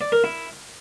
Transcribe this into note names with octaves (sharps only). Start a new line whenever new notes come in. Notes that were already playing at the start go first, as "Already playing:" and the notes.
D5
A#4
E4